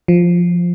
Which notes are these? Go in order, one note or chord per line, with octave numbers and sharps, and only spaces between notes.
F3